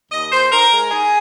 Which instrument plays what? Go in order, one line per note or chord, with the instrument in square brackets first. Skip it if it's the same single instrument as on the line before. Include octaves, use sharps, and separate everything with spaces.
[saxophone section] D#2 D#5
D#2 C5
D#4 A#4
G#3
D#4 G#4